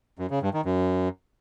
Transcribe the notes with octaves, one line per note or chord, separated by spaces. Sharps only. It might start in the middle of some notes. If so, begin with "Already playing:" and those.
F#2
C#3
G2
D#3
F#2